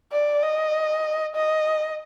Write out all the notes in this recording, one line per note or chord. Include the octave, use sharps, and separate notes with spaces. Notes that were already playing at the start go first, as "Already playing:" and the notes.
D5
D#5
D#5